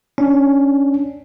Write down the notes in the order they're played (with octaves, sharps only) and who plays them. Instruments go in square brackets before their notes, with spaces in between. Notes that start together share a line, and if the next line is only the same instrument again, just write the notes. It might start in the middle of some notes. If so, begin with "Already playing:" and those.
[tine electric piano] C#4 D4